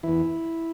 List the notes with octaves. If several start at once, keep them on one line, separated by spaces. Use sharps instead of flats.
E2 E3 E4